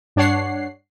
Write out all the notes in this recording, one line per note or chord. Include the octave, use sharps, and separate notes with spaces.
G2 D4 C#5 F#5 C7